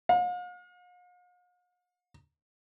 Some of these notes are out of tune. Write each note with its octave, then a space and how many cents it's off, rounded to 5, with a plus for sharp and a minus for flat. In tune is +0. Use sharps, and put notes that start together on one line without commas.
F5 +45